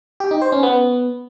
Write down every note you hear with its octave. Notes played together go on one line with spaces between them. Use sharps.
G4
D#4
C5
C#4
B3